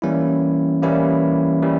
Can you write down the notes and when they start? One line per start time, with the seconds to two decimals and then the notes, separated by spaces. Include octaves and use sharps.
0.02 E3 G3 A#3 C#4 E4
0.83 E3 G3 A#3 C#4 E4
1.62 E3 G3